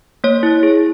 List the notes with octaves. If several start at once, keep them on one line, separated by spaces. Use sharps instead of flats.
A#3 C#5
E4
G#4